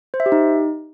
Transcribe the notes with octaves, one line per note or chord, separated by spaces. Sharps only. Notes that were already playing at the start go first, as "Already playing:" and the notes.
C5
E5
G4
D#4